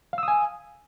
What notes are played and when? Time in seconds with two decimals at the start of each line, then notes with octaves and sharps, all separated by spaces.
0.13 F5
0.18 E6
0.23 D#6
0.28 G#5